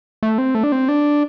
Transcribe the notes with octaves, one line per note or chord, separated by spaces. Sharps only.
A3
C4
A3
D4
C4
D4